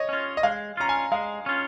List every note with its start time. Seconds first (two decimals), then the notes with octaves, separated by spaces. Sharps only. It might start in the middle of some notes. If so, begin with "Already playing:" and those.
Already playing: C#5 D#5
0.09 C#4 F4
0.37 D#5
0.43 G#3 F5
0.77 C#4 F4 A#5
0.89 G#5
1.12 G#3 F5
1.46 C#4 F4